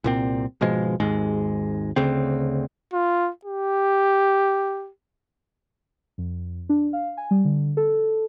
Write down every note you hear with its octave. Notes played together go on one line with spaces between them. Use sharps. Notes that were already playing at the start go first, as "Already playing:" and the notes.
C2 A#2 C4
G#1 B2 F3 G#3
G#1 D#2 G#2 G#3
D2 C#3 C4
F4
G4
F2
D4
F5
G#5
G3
D3
A4